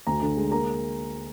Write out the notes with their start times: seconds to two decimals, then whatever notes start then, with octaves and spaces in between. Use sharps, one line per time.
0.07 D2 A#5
0.22 D3
0.37 G#3
0.51 A#3 A#5